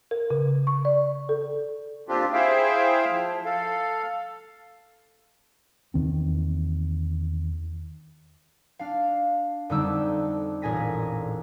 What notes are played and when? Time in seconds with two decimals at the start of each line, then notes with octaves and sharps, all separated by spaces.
0.11 A#4
0.30 C#3
0.67 C#6
0.85 D5
1.29 A4
2.08 A#2 C4 D4 F4 G4
2.33 E4 G#4 C5 E5 F5 G5
3.10 F3
3.45 A4 F5
5.94 E2 D#3 C4
8.79 D4 F5
9.69 F2 D3 G3 D#4 D6 E6
10.62 A1 A#2 G#4 G#5 A#6 B6